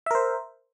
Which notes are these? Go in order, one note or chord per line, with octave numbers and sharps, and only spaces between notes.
A#4 C5 E5